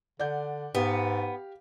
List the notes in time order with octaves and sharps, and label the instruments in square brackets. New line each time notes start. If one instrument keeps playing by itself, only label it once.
[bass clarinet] D3 [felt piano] D5 F#5 G6
[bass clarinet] G#2 [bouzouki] B3 [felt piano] G4 F5